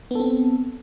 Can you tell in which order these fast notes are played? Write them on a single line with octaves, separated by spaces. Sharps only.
B3 A4 C4